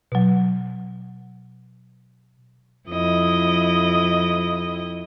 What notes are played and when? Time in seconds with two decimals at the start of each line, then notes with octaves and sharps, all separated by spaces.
0.12 B2 F#3
2.89 F2 E4 D#5